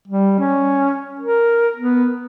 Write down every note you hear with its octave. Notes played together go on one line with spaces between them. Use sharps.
G3
C#4
A#4
B3